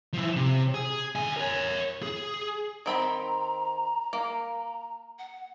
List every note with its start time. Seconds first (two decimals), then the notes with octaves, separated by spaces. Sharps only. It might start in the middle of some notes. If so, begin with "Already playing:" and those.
0.14 F3 E4
0.36 C3
0.74 G#4
1.15 D3 G#5
1.36 A#4 C#5
2.03 G#4
2.86 D#3 C4 A#5 B5
4.13 A#3
5.19 F#5